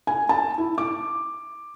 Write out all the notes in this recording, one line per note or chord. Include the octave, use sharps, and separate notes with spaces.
G#5
A5
E4
D6